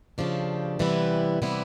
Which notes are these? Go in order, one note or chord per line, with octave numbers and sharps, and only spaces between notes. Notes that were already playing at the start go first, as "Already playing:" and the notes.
C#3 F3 A3 D4 G4
C3 E3 G3 B3 E4
C3 E3 G3 B3 E4